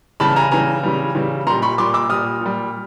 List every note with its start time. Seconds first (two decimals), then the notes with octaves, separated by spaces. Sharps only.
0.20 C#3 E3 G3 A5 B5
0.36 G#5 A#5
0.51 C#3 E3 G3 G#5 A#5
0.83 C#3 E3 G3
1.15 C#3 E3 G3
1.47 A#2 G3 A#5 C6
1.62 B5 C#6
1.78 A#2 G3 C6 D6
1.94 D6 E6
2.09 A#2 G3 D#6 F6
2.41 A#2 G3